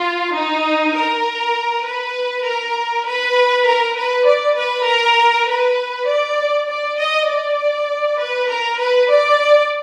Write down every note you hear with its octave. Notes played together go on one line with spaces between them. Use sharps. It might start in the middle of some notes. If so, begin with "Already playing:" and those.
Already playing: F4
D#4
A#4
B4
A#4
B4
A#4
B4
D5
B4
A#4
B4
D5
D5
D#5
D5
B4
A#4
B4
D5